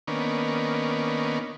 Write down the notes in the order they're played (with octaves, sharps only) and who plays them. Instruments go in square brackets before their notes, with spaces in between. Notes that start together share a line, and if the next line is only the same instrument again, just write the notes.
[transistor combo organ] D#3 A#3 B3 C#4 D4